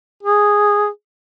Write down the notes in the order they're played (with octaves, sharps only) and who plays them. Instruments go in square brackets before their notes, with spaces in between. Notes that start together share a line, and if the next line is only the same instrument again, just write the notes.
[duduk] G#4